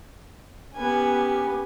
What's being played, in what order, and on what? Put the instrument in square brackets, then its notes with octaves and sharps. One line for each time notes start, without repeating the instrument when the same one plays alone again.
[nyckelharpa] B3 G#5 [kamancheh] C#4 G4